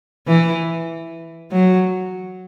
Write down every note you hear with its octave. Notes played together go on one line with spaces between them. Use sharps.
E3
F#3